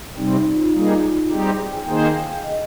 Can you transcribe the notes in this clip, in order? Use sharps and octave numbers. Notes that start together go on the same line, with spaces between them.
C3 G3 C4 D#4
D#4
D#4
F4
G3 A#3 D#4 G#4
G3 C4 D#4 G4 G#4
G#4
G5
G#5
D#3 A#3 D#4 G#4 C5 G5
F5
D#5